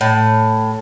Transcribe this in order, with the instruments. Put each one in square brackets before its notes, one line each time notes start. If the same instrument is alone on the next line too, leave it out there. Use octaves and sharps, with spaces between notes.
[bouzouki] A2